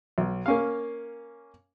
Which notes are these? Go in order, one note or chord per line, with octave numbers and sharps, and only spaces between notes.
B1
A#3 C#4 F5